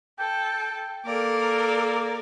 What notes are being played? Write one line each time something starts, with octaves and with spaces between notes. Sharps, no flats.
A4 G5
A#3 A4 A#4 D5